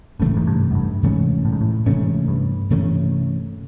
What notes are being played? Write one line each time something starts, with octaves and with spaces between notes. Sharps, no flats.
A2 C3 E3 A3 C#4
G#2
G2
F#2
G2
G#2 C3 E3 A3 C#4
A2
G#2
A2
G#2 C3 E3 A3 C#4
G2
C3 E3 A3 C#4